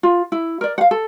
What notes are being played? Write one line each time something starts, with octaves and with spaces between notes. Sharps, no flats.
F4
E4
A#4 D5
F5 F#5
A4